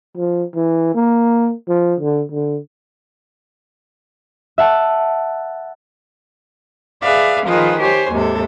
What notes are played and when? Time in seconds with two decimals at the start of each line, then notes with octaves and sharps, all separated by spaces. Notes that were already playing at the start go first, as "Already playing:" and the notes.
0.17 F3
0.55 E3
0.94 A#3
1.68 F3
2.00 D3
2.32 D3
4.58 E5 F#5 A5
7.01 G#4 B4 D5 E5 F5
7.47 D#3 F3 F4 G#4 B4
7.81 G4 C5 C#5 G#5
8.12 D#2 G#2 C3 A4